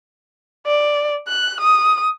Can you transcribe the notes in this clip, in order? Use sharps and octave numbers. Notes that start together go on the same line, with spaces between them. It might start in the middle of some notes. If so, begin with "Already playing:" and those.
D5
F#6
D#6